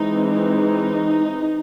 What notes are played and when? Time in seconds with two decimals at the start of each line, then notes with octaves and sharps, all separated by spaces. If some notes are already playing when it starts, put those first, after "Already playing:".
Already playing: E3 G#3 C4 D#4
0.30 D#4